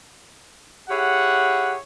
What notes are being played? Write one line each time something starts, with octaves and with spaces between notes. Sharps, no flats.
E4 G4 G#4 C#5 F#5